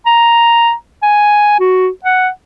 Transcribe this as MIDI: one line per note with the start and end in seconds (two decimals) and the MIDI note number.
0.06 0.73 82
1.02 1.59 80
1.60 1.89 66
2.04 2.29 78